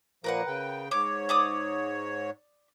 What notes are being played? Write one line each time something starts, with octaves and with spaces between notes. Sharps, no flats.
A#2 F3 A#3 A#4 B4 F#5
C#3 G5
G#2 C#5 D6
D5 D6 D#6